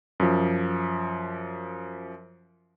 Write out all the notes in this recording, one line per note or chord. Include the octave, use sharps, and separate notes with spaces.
F#2 F3